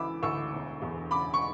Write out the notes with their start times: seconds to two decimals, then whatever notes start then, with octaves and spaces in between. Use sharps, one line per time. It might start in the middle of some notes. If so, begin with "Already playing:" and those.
Already playing: D2 C#3 E3 B5 D6 E6
0.23 D2 C#6 E6
0.53 E1
0.82 E2
1.11 C#3 B5 D6
1.34 C#6